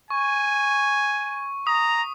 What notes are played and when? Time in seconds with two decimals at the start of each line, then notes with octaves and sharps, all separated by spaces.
0.10 G#5 C#6
1.67 A#5 D#6